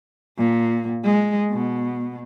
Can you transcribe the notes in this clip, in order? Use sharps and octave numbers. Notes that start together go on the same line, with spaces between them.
A#2
G#3
B2